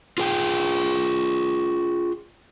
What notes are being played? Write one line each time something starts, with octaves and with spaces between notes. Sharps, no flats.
F4 G#4 G5